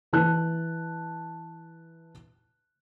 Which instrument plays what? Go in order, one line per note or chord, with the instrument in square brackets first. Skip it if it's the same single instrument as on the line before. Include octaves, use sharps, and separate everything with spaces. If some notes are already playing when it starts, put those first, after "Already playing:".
[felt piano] E3 A5 F#6